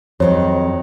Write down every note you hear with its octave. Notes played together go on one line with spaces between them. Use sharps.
F2 D#3 F#3 C5 C#5